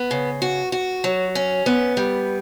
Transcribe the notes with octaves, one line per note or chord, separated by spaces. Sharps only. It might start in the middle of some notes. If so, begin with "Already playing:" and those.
Already playing: B3
C#3
F#4
F#4
F#3
C#4
B3
G3